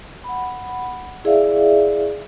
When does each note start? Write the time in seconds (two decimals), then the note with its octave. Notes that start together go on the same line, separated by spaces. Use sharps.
0.24 F#5 B5
1.24 E4 G#4 D5 E5 F5